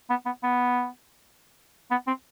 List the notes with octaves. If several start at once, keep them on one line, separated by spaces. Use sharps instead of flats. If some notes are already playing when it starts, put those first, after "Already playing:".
B3
B3
B3
B3
C4